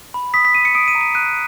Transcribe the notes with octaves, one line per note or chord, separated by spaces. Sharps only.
B5
D#6 B6
B6
D#6 D#7
C#7
D#6 D7
D#7
A#5
D#7
F#6 D#7